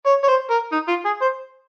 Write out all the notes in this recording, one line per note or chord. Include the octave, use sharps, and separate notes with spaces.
C#5
C#5
C5
A#4
D#4
F4
G#4
C5